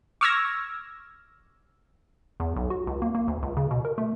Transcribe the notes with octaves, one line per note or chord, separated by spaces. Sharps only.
C#6 D6 E6 F6 G#6 A#6
E2
B1
F#4
C#2
A#3
A#3
D2
C#2
C#3
B2
A#4
A3